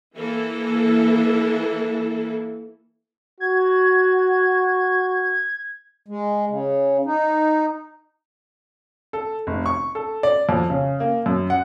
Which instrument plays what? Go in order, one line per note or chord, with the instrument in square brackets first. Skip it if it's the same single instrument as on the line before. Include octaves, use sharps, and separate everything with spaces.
[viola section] E3 A#3 E4 A4
[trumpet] F#4 [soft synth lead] G#6
[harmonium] G#3
C#3
D#4
[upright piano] A4
F1
C#6
A4
D5
F2
C#3
A#3
F#2
F#5